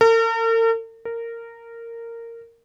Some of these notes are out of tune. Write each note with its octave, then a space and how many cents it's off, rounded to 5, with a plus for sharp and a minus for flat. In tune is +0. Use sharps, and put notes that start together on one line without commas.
A#4 -45
A#4 -15